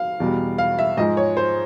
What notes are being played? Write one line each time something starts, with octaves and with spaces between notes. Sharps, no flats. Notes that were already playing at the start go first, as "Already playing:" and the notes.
Already playing: F5
E2 B2 G3
F5
E5
G#2 F3 G#3 D#5
C#5
C5